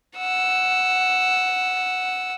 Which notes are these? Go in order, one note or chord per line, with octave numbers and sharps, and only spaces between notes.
F#5 E6